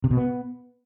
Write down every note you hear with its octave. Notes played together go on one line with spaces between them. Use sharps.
C3
B2
B3